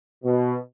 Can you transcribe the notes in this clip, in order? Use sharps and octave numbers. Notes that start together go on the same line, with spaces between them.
B2